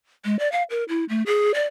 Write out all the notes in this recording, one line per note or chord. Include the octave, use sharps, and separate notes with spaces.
G#3
D5
F5
A#4
E4
A3
G#4
D5